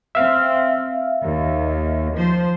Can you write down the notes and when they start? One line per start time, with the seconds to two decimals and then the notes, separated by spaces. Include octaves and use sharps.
0.15 C4 E5 F5
1.21 D#2
2.15 F3 C5